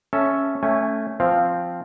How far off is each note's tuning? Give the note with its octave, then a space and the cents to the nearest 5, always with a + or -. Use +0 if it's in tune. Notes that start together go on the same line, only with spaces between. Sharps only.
C#4 +0 A4 +0 E5 +0
A3 +0 C#4 +0 G#5 -25
F3 +0 C4 +0 F5 +0